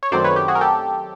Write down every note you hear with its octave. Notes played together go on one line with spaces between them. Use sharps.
C#5
F#2 D#3 F#3 A3 C4 C5 D5
B4 C#5
G4
F#4 G#4
A#4
G4 A4